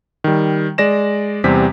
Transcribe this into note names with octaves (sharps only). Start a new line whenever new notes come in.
D#3 G3
G#3 D5 A#6 E7
E2 C3 G3 C4 B6